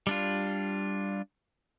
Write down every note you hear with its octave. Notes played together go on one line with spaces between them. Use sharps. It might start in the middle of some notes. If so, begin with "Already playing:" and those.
G3 D4 F4